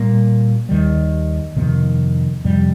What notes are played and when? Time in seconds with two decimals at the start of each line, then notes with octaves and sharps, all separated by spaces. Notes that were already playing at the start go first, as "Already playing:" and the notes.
Already playing: A#2 G3 A#3
0.69 D#2 D#3 G3
1.56 F2 C3 D#3 A#3
2.44 F2 C3 G3